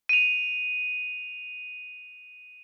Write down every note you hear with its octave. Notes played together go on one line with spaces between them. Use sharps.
D#7 F7